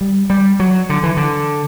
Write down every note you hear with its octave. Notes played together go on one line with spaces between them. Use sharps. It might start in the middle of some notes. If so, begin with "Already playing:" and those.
G3
G3
F#3
D3
E3
D3